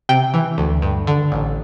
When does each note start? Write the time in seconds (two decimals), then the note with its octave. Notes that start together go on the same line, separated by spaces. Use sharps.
0.09 C3 G5
0.34 E3
0.58 D2
0.82 G2
1.07 D3
1.32 A1